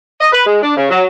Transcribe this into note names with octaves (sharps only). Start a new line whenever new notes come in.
D#5
B4
G#3
D4
C#3
F#3